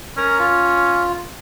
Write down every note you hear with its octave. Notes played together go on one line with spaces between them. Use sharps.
C#4 A#4 A#5
F4